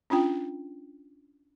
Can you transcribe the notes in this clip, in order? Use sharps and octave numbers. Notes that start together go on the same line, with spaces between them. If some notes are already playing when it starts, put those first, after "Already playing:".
C#4 D4 F4 G5